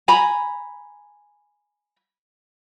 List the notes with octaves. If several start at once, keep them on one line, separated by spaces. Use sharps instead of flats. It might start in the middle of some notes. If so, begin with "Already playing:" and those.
G#5 A#5 B5